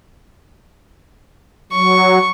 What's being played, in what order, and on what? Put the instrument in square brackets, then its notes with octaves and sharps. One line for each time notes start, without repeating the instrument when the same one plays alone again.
[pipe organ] F#3 [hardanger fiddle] C#6